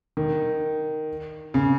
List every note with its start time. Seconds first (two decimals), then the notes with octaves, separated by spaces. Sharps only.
0.17 D#3
1.54 C#3